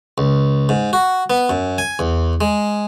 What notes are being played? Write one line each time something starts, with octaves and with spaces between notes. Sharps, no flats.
C#2
G#2
F#4
B3
F#2
G#5
E2
G#3